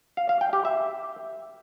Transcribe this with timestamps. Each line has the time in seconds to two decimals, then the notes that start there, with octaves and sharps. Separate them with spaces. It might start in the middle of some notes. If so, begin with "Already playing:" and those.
0.17 F5
0.29 F5
0.41 G5
0.53 G4
0.65 E5